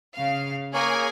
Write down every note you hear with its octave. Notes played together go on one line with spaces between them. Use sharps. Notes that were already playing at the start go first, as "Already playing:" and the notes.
C#3 F5
A#3 G#4 A#4 C#5 G#5